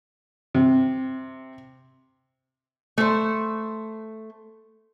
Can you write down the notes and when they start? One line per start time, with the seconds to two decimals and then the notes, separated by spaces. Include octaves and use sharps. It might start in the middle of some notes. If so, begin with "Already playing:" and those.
0.55 C3
2.98 A3 C5